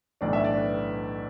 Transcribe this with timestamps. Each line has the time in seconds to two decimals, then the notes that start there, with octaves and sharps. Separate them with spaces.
0.21 B1 A2 E3 A3 D4 D5
0.33 E5
0.44 D5
0.56 B4